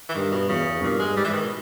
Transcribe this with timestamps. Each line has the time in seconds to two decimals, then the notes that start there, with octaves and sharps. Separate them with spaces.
0.09 E3
0.15 G2 D#3
0.32 B2
0.49 E2 C#3
0.82 G2 A#2
0.99 G#3
1.16 G#2 G3
1.24 E3
1.33 D#3
1.42 B2